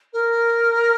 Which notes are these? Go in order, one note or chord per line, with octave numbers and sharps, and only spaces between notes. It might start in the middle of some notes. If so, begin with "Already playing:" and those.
A#4